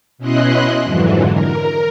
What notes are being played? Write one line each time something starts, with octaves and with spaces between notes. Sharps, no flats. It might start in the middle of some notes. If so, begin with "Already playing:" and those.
B2 C#4 E4 D#5 C6 F#6
F2 G#2 D3 E3 F#3
A#4